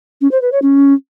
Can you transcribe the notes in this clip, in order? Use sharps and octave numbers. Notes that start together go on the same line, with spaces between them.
C#4
C5
B4
C#5
C#4